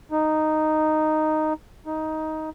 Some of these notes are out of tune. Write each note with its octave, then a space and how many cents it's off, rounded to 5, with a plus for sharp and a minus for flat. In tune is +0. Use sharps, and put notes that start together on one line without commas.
D#4 -5
D#4 +10